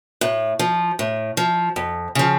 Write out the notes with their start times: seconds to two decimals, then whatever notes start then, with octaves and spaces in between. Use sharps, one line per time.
0.21 A2
0.59 F3
0.99 A2
1.37 F3
1.76 F2
2.15 C#3 F3